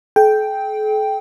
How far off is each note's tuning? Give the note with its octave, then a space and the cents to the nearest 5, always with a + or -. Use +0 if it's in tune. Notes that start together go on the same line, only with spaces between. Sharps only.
A4 -45 G5 +0